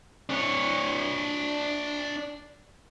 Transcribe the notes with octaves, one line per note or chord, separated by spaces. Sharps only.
D4 C#5